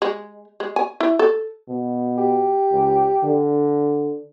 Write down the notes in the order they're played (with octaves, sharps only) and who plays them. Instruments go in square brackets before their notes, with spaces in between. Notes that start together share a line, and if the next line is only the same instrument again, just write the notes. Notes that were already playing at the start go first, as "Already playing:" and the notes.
[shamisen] G#3
G#3
G#5
E4
A4
[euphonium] B2
[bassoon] G4
[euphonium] C#2
D3